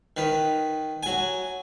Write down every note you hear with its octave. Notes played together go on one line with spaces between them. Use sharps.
D#3 B4
F#3 G#5